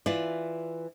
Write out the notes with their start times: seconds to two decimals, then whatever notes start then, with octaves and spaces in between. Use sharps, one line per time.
0.06 E3 E4 F4 D5